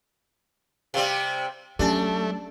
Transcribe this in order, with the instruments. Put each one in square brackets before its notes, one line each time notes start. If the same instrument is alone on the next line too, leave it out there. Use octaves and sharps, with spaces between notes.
[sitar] C3 G3 [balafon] F5
[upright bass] F#3 [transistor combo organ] A3 [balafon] C#4 G4 [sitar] D4